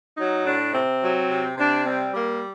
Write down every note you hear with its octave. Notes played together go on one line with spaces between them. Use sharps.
F#3 D#4
A2 D4
C3 C4
F#3
C3
C3 D4
G3 C4
G3 A#3